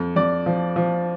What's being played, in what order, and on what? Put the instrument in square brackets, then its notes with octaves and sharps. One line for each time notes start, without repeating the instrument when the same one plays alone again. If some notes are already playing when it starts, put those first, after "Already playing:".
Already playing: [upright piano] F2
F2 D5
F3
F3